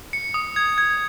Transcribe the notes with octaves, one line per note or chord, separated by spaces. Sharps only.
C#7
D#6
G#6
G#6